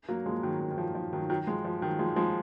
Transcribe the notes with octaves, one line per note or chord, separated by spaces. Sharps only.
F#3 A#3
F3 G#3
D#3 F#3
D#3
D#3
F3
F3
D#3 F#3
D#3 F#3
F3 G#3
F3
D#3 F#3
F3 G#3
F3 G#3